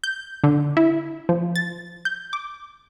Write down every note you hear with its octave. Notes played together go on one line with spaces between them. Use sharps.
G6
D3
E4
F3
A6
G6
D6